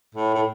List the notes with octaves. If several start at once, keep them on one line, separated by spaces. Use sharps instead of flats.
A2
A2